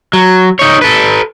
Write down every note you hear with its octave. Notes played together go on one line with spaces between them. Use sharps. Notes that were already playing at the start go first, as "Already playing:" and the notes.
F#3
D#4 C#5
A4 B4